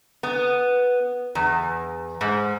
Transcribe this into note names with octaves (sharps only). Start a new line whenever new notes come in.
B3
E2
G#2